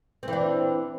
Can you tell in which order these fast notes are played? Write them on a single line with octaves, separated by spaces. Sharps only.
C4 E3 D4